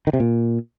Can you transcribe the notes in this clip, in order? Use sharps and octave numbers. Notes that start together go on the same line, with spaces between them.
D#3
C3
A#2